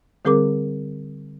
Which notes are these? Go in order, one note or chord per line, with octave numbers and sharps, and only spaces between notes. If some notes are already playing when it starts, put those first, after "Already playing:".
D3 G3 C4 G#4 A#4 D6